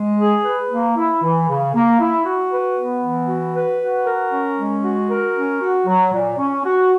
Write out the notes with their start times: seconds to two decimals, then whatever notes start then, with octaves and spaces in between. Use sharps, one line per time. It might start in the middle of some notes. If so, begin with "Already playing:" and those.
Already playing: G#3
0.18 G#4
0.44 B4
0.70 A#3
0.96 E4
1.22 E3
1.47 C#3
1.73 A#3
2.00 E4
2.25 F#4
2.51 B4
2.77 B3
3.03 E3
3.28 F#4
3.54 B4
3.81 F#4
4.06 A#4
4.32 C#4
4.58 G#3
4.84 F#4
5.09 A#4
5.35 C#4
5.61 F#4
5.87 F#3
6.13 A#2
6.38 C#4
6.65 F#4